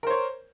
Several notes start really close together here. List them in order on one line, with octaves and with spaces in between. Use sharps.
A#4 C5 C#5